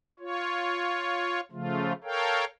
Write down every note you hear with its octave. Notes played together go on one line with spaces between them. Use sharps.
F4 C#5
C#3 F3 A3 F4
A4 A#4 C#5 F5 G5